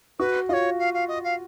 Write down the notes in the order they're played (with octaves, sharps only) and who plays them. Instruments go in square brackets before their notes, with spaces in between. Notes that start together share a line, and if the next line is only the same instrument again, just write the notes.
[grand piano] F#4 [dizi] B4
[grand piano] F4 [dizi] C#5 D#5
[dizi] F5
F5
D#5
F5